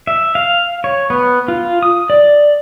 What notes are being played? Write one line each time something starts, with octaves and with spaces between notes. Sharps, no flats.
E5
F5
C#5
B3
F4
D#6
D5